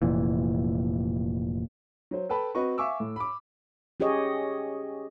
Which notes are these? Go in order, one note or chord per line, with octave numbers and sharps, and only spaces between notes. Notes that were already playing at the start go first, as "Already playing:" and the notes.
F1 A#2 E3
F#3 C5
A4 B4 G5 A5 B5
C4 F#4 B4 D#5 C#6
E5 F5 G#5 C#6 D6 E6
A2
B5 D6
C#4 G4 G#4 C#5 D#5